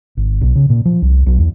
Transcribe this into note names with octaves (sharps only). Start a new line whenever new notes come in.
G#1
B1
C#3
A#2
F3
C2
B1
E2